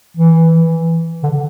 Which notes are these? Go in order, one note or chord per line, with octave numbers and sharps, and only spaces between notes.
E3
D3